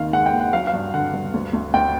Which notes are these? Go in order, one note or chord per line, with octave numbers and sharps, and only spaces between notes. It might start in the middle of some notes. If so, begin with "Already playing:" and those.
Already playing: D#2 D#3 F5
G#3 F#5
G5
D#2
F#5
F#3 F5
F5
G2
D3 F#5
G2
D2
D2
D2 G5